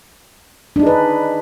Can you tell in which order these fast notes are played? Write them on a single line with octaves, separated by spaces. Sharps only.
D4 D#4 G#4 B4